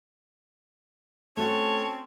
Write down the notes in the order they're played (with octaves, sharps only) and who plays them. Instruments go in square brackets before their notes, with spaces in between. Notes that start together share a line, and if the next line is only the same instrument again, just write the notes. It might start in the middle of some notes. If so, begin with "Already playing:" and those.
[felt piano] A3 F#4 [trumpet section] C4 C#4 [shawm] C#5 [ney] A5